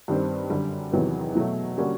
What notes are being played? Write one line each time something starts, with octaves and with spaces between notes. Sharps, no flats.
G2 D#3 G3 C4
F#2 D3 G3
E2 C3 D#3 F#3 B3
B2 F#3 A3
D3 G3 A#3 C#4 F#4